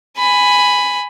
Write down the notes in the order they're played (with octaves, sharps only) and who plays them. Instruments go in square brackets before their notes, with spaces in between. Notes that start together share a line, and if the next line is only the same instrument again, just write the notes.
[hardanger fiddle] G#5 B5